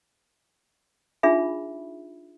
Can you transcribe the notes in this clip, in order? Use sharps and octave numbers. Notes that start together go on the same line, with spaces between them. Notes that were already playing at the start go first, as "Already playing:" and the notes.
D4 D#4 F4 G#4 E5 B5